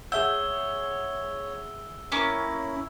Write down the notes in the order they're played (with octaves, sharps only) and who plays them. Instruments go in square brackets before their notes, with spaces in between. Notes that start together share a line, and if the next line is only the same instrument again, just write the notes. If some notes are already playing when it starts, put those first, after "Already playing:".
[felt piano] G#4 E5 F#5 [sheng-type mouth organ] C#5 [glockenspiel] E6 G7 [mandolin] G6
[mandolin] A#3 C#4 D6 [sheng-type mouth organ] E4